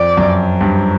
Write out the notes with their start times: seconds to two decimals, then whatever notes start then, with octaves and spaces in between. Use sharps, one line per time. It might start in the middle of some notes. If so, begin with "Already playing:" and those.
Already playing: F2 D5
0.17 F#2
0.61 G2